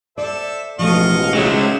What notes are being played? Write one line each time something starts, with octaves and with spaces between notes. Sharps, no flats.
A4 C5 D5 E5
A1 G#2 B2 F3 A3 D#5 F5 C#6
F#3 G#3 C#4 C5 E5 F#5